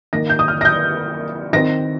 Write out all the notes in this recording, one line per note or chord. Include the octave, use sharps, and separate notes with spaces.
D#3 A#3 A#6
G6
D#6
F6
A#6
G6
D#3 C4 A#6